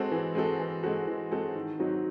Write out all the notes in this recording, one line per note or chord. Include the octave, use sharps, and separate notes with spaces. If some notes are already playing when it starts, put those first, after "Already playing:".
Already playing: G#3 C4 F#4 A4
E3
G#3 C4 F#4 A4
E3
G#3 C4 F#4 A4
E3
G#3 C4 F#4 A4
D#3
F#3 C4 D#4 F#4